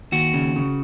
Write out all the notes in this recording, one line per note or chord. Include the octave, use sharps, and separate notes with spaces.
D#2 F#4
C#3
C#3